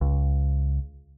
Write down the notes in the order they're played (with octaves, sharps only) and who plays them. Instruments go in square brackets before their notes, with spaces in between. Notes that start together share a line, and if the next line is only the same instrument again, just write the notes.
[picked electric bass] C#2